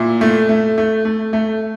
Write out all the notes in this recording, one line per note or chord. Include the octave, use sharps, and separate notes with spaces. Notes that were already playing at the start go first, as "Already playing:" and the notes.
Already playing: A#2 E4
A3
A3
A3
A3
A3